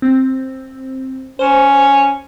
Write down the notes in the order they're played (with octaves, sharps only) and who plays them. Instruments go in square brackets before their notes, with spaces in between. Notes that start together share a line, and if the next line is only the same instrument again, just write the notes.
[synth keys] C4
[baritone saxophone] C#4 [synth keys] C5